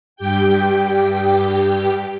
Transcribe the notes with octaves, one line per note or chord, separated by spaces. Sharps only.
G2 G4 G5